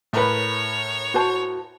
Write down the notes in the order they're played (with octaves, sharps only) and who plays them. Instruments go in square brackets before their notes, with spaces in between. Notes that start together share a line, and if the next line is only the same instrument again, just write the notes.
[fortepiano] A2 A#4 B4 [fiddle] C#5
[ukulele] F#4 C5 A5